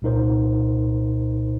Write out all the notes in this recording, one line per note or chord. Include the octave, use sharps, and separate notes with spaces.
C2 A#2 D#4 A#4 C5